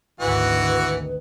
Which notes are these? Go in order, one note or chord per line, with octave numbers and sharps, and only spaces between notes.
G#1 D2 D#3 E3 F#4 B4